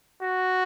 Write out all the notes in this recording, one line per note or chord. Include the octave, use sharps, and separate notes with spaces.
F#4